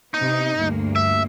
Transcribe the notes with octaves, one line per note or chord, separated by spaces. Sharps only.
C3 B3 D#4
D2 G2 A#3
E5